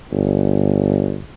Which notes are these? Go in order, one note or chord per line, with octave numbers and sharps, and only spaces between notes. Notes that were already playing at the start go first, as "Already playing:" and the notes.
G1